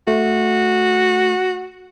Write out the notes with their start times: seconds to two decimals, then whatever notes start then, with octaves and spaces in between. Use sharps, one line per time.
0.08 A3 F#4